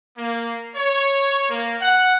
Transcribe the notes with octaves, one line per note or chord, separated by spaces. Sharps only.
A#3
C#5
A#3
F#5